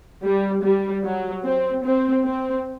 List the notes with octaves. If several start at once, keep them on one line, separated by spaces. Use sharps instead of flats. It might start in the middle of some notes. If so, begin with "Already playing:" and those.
G3
G3
F#3
C4
C4
C4